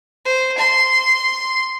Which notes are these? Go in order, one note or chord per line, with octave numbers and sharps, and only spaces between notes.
C5
C6